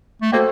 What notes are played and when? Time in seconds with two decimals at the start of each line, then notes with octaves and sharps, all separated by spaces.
0.22 A3
0.32 A#3 F#4 A4 C5 D#5 G5